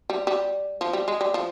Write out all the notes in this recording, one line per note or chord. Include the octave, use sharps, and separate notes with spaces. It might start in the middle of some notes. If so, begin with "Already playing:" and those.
G3
G3
F3
G3
G#3
G3
F3